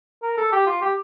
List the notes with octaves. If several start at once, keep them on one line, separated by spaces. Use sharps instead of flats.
A#4
A4
G4
F4
G4